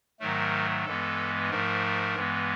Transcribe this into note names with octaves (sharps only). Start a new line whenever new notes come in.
G#2 D#3 F#3 A3 A#4
G2 E3 G#3 B3 A4
G#2 F3 A3 A#4
G2 E3 G#3 B3